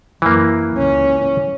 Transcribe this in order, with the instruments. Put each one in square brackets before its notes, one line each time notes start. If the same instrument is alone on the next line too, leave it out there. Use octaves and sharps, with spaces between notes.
[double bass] F#2 [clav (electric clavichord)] E3 A#3
[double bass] C#2 C#4